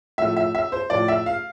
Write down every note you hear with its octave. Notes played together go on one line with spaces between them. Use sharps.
A2 F3 A3 E5
E5
E5
C5
A2 F3 A3 D5
E5
F5